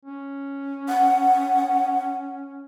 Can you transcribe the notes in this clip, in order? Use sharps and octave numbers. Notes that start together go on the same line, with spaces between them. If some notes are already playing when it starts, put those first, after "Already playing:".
C#4
F#5